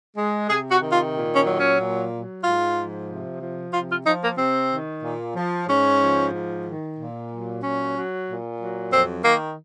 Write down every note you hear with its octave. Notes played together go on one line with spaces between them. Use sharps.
G#3
C3 G#4
F#4
D#3
F4
A#2
C#4
F#3
C#4
A#2
F#3
G#2 F4
F3
C3
F3
C3 F4
F4
F3 D#4
A#3
C3 C4
D#3
A#2
F3
G#2 C#4
F3
G#2
D#3
A#2
F#3
A#2 C#4
F#3
A#2
F#3
F2 C4
D#3 A#3